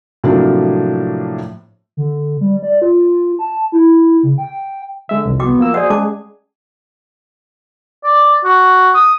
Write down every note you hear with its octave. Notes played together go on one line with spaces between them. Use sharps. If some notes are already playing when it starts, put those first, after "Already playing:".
A2 C3 F3 F#3 A#3 D4
D3
G3
D5
F4
A5
E4
C#3
G5
D3 G#3 E5
C2 F2
B3 F#4 G5 D6
F3 A#3 E6
F#4 G#4 C5 D5 F#5 D#6
G#3 C#4 G#4 A5 D6
D5
F#4
D#6